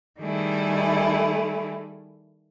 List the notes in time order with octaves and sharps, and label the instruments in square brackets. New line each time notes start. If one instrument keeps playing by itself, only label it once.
[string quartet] D#3 G3 A3 E4 G#4